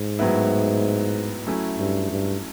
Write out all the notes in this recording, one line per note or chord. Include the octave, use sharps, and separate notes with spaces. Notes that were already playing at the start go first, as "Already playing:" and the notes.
Already playing: G#2
A2 F#3 B3 E4
F#3 A3 C#4 E4
G2
G2